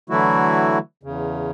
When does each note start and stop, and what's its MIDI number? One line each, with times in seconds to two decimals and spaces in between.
0.10 0.78 50
0.10 0.78 52
0.10 0.78 54
0.10 0.78 57
0.10 0.78 64
0.10 0.78 66
1.03 1.51 40
1.03 1.51 49